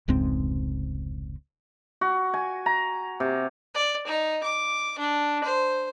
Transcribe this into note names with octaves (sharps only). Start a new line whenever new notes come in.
F1 C#2 G#2 C4
F#4
G#5
A#5
C3
D5
D#4
D6
D4
C5